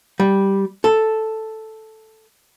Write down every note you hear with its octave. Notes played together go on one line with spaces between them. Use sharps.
G3
A4